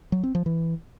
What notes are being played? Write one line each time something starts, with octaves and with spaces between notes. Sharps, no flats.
F#3
C4
F3
E3